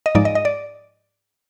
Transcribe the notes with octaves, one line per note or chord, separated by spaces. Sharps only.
D#5
G#2 F3 G#3 D#4 D5
D#5
D#5
D5